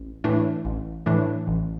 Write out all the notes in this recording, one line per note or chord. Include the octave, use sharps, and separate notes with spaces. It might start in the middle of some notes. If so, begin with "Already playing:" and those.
Already playing: A1
A2 E3 A3 D4
A1
A2 E3 A3 D4
A1